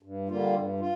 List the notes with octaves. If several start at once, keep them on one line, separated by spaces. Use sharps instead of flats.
G2
D3 G3 A#3 F4
G2
F4